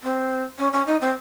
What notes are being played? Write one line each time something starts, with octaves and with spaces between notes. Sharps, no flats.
C4
C#4
C#4
D#4
C4